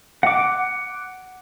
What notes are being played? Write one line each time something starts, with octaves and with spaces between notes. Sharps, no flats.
F#5 D6